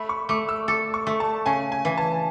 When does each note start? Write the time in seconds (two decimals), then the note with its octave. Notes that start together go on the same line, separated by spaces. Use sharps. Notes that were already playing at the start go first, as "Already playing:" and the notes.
Already playing: A3 B5
0.09 C#6
0.29 A3 D6
0.49 E6
0.68 A4 D6
0.94 C#6
1.07 A3
1.20 A5
1.46 C#3 G#5
1.72 G#5
1.85 E3
1.98 A5